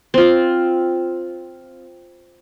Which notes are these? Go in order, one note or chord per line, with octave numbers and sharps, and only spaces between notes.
C4 F4